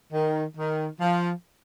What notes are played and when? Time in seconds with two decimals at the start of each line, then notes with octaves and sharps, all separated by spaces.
0.13 D#3
0.57 D#3
1.01 F3